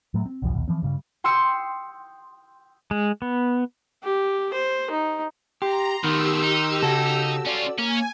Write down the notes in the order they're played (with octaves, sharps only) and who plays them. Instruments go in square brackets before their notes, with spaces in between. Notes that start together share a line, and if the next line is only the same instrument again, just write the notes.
[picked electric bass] A2 F#3 A3
C4
B1 E2 G2 F3
A#1 D#2 B2
E3 F3 C4
G2 C#3 G3
[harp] G5 C6 D#6 E6 C7 C#7
[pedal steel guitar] G#3
B3
[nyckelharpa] G4
C5
D#4
[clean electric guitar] G4 [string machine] A#5 [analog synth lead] C6
[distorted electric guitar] B2 A3 [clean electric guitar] D#3 [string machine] G4 E6
[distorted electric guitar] D#4
[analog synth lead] C#3 [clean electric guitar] F#4 A4
[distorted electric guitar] C#4 F4 [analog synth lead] D5
[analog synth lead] A#3 [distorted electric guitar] C#4 [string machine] G#5